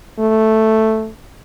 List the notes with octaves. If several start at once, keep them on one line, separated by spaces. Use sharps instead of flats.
A3